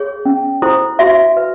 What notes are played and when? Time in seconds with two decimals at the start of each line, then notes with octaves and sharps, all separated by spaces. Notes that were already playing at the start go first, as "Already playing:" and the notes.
Already playing: G#4 C#5
0.25 C#4
0.62 E4 A4 C5
0.99 F#4 E5
1.37 B4